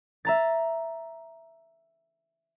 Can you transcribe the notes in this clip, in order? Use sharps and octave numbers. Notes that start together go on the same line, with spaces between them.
E5 A#5 A6